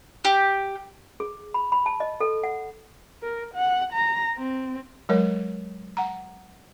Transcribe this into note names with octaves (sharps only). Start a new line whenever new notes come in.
G4
G#4
B5
B5
A5
D#5
A4
F#5
A#4
F#5
A#5
C4
F#3 G#3 A#4 C#5
F#5 A#5